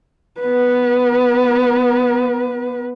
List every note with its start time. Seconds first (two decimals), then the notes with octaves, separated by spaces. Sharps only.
0.41 B3 B4